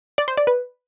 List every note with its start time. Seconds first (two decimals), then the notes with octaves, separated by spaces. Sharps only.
0.18 D5
0.28 C5
0.37 D5
0.47 B4